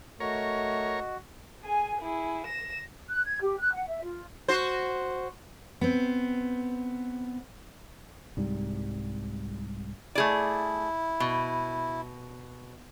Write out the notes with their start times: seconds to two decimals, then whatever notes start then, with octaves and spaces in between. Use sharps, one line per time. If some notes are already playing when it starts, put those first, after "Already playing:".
0.20 A3 F#4 A#4 C#5 D#5
1.64 G#4 G#5
2.02 E4 G#4
2.47 A#6 E7
3.09 F#6
3.25 G#6
3.41 G4
3.59 F#6
3.73 F#5
3.86 E5
4.02 F4
4.48 F#4 C5
5.81 B3 C4
8.37 C2 G#2 G3
10.15 A3 E4 G#4 D5
11.20 B2